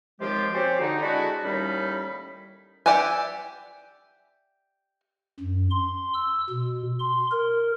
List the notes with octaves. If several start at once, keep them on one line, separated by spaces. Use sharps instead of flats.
D#2 C3 F3 G#3 F4 G4
C4 C#4 F#4 G4 C5 D5
D3 D#4
G#3 D4 E4 F#4
D#2 A2 G3 C#4 D#4 B5
G4 D5 E5 F#5 G#5
F#2
C6
E6
B2
C6
A#4